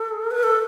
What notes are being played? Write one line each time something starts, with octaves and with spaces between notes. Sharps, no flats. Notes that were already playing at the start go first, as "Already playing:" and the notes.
Already playing: A4
B4
A4